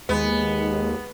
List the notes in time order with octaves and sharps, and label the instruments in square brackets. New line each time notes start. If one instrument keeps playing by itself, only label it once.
[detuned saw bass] D#2 [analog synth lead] G#3 [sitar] B3